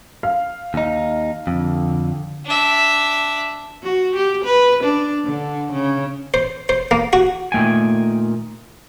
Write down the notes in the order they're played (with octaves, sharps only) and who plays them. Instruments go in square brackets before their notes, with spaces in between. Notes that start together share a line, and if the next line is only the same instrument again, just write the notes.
[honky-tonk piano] F5
[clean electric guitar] D#2 D#4
[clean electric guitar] F2 [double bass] D3
[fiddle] D4 E5
[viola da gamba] F#4
G4
B4
D4
D3
C#3
[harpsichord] C5
C5
A#3
F#4
[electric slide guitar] A#2 D#3 A3 G5 G#5